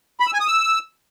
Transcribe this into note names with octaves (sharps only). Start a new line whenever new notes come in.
B5
E6
G#5
D#6
E6